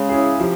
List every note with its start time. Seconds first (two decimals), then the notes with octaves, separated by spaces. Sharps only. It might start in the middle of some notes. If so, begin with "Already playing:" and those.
Already playing: C#3 G#3
0.09 C#4 E4 G#4
0.39 C3 F3